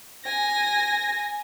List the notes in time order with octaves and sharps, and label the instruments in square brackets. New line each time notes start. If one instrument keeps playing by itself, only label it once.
[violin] G#5 A#6